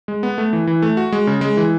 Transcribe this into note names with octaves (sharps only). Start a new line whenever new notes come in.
G#3
B3
A3
E3
E3
A3
F#4
G#3
C#3
G#3
E3